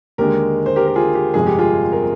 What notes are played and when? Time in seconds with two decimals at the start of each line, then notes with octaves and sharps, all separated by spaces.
0.18 D#2 D3 G#3 G4 A#4
0.66 C5
0.76 G4 A#4
0.87 A#4
0.96 F4 G#4
1.15 G4
1.34 G1 F2 C3 F3 G#3 G#4
1.46 G4
1.59 F4 G#4
1.92 A#4